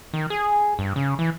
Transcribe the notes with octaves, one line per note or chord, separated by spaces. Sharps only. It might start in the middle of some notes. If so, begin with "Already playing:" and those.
D#3
G#4
G2
C#3
E3